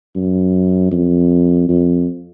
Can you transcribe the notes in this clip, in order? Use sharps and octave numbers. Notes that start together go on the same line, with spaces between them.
F#2
F2
F2